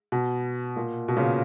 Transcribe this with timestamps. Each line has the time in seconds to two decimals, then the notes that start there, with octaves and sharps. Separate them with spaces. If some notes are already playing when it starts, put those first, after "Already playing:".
0.12 B2
0.76 A#2
1.08 B2
1.16 A#2 C#3